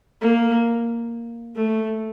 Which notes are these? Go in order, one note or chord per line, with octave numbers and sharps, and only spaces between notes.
A#3
A3